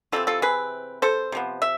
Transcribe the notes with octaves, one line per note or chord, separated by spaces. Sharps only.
C3 E3 G#3 C4 F4 A4
F4 A4
G#4 B4
A4 C5
C3 F3 B3
E5